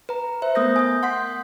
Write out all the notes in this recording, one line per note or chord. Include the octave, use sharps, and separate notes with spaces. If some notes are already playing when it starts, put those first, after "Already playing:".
B4 A#5
C5 E5
A3 B3 A#4 D#6 G6 A#6
G#5 D#6 G6
F#5 C6 G6 B6